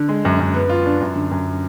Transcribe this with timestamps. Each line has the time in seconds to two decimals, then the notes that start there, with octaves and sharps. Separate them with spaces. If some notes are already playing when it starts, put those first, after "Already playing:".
Already playing: D3
0.09 G#3
0.25 F#2
0.40 F#2
0.54 B3
0.70 F4
0.86 D4
1.01 F#2
1.16 D3
1.31 F#2